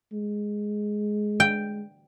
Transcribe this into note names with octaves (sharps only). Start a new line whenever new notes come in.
G#3
G5